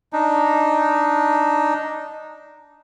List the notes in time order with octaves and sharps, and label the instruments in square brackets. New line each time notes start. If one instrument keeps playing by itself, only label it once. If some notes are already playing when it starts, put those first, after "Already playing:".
[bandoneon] D4 D#4